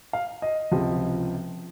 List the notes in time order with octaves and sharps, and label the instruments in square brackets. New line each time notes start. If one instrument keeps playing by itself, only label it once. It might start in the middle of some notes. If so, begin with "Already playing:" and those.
[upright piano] F5
D#5
C#2 C3 F3